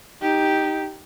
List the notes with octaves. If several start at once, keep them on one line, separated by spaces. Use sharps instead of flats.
D#4 G4